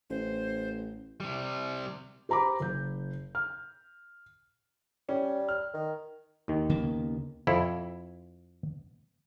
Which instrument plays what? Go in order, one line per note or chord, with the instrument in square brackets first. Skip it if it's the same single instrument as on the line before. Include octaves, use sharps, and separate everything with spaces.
[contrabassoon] A1 [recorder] C5
[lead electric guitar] C3 G3
[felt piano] G4 C5 A#5 B5 D6
F#1 G6
F6
[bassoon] G3 [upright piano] C#4
[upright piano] F6
[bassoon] D#3
[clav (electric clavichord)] D#2 D#3
[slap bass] C#3 A#3 B3
[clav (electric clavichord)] F2 E4